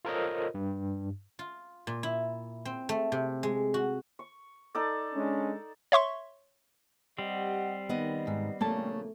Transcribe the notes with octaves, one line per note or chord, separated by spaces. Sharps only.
F4 A4 A#4 C5 C#5 D#5
G2
F4
A#2
E4
C4
A3
C3
G#3
F#4
C#6
D#4 A4 D5
G#3 C#4 D4
C#5 E5 C6 C#6
G3 C4 G4 D#5 F#5
D#3 B3 D#5
G#2
A#1 C#3 A3 A#3 C#5 A5